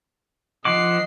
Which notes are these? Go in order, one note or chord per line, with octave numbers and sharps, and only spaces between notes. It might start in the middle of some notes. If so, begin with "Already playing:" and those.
F3 D#5 F#5 D6 C7